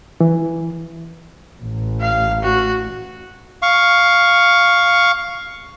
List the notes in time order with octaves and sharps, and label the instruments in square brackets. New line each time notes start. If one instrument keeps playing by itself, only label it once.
[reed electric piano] E3
[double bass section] A1
[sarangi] F5
F#4
[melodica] F5 C#6